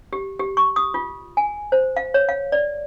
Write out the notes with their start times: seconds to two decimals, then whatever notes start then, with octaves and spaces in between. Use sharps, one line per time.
0.13 G4
0.39 G4
0.57 C#6
0.76 D#6
0.94 F4
1.37 G#5
1.72 C5
1.96 F5
2.14 C#5
2.29 F5
2.52 D5